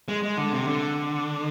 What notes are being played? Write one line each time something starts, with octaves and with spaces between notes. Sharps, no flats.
G#3
G#3
D3
C3
D3